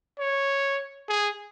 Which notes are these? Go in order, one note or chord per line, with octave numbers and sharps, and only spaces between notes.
C#5
G#4